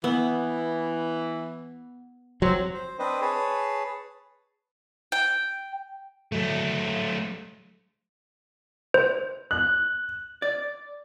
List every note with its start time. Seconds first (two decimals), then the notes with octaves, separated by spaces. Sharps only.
0.04 E3 B3
2.42 F#3 C4
2.74 C5
2.99 C4 D4 B4 C5 D#5
3.21 G#4 B4 C#5 A5
5.12 G5
6.32 F#3 A3
8.94 C5
9.51 F#6
10.42 D5